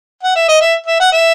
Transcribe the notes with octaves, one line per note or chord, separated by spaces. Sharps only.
F#5
E5
D#5
E5
E5
F#5
E5